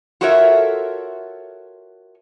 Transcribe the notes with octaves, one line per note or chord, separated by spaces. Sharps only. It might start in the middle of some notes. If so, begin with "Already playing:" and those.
F4 F#4 A4 A#4 C#5 E5